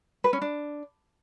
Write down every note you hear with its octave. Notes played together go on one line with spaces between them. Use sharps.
B4
C#4
D4